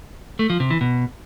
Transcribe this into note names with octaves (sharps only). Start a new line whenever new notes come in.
A3
F3
C3
E3
B2